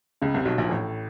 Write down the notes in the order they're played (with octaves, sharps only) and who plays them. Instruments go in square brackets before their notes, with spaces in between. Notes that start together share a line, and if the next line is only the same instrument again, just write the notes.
[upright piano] C#2 C#3
C2 C3
B1 B2
A#1 A#2
A1 A2